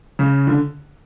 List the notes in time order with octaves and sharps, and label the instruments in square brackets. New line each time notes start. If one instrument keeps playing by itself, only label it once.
[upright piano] C#3
D3